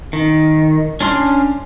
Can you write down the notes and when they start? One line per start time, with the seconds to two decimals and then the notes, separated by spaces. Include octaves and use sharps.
0.13 D#3
1.01 C#4 D4 C6 F6